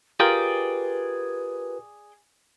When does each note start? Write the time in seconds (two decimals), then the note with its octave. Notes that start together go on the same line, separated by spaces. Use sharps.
0.20 F4 G4 G#4 A#4 B4 D5 G5